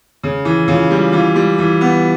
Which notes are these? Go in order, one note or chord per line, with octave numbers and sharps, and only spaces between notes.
C#3
E3
C#3 F4
G3
E3 F4
G3
E3
B3